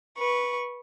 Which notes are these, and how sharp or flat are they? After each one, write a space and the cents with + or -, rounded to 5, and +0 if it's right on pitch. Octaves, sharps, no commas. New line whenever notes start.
B4 -20 C#6 +0